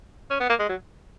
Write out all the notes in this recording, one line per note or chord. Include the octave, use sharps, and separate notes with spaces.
C#4
B3
A#3
G#3
F#3